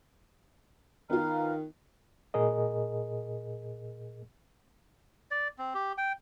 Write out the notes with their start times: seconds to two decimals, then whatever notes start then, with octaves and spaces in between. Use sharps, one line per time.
1.10 D#3 B3 F4 F5 A#5 F6
2.34 A#2 G#4 A#4 D#5
5.31 D5
5.58 C4
5.74 G4
5.98 G5